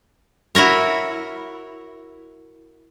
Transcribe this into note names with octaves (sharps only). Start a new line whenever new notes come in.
E4 F#4 A#4 C#5